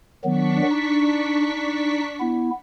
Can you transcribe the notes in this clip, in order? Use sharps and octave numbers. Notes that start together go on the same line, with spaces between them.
D#3 F#3 B3 D4 C#6 B6
D#4
B3 E4